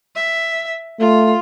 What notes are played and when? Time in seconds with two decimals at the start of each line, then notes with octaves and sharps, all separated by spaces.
0.16 E5
1.00 A3 F4